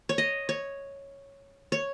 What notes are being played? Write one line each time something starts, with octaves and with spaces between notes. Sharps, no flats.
C#5
D#5
C#5
C#5